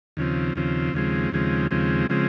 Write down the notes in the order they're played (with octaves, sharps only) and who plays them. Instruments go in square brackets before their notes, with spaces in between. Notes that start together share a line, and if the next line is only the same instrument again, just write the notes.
[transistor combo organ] D#2 C#3 F3 C4
D#2 C#3 F3 C4
D#2 C#3 F3 G#3 C4
D#2 C#3 F3 G#3 C4
D#2 C#3 F3 G#3 C4
C#3 F3 G#3 C4